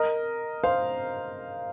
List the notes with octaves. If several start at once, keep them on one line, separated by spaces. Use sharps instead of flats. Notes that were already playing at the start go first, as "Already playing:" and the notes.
Already playing: A#4 D#5
C5 F5